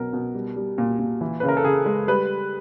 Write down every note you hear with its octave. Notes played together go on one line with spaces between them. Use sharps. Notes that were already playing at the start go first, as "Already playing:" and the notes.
Already playing: B2 F#3 A#4
B2
G3
G3
A#2
A#2
E3
C#3 B4
A#4
A4
C#3 G#4
G#3
G3 B4